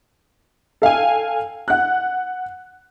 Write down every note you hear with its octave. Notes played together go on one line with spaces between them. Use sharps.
A4 F5 G5 G#5
F#5 F#6